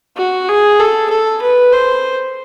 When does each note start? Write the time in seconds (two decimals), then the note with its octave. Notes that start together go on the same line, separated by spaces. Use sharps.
0.17 F#4
0.48 G#4
0.79 A4
1.10 A4
1.42 B4
1.73 C5